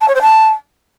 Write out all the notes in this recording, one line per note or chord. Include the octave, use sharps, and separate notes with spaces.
A5
C#5
C5
A5